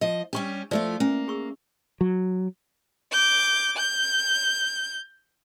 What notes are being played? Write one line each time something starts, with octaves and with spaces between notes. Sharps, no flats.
F3 D#5
G3 C#4 D4 G4 C#6 E6
F3 A3 F4 C5 D5 E5
A#3 C#4 G#5
G#4 C#6 E6
F#3
D6 G6
G6